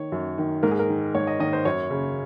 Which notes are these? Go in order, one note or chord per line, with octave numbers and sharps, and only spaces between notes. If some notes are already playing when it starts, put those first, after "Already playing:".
Already playing: D#3 C#5
F#2
D#3
G#2 A#4
G#4
A#4
D#3
G#2 C#5
D#5
D#3 D#5
C5
F#2 C#5
C#3